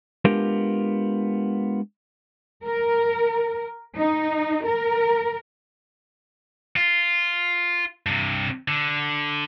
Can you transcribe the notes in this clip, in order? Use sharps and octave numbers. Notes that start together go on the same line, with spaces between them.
G#3 B3 D4 F4 G4 A#4
A#4
D#4
A#4
F4
G2 C3
D3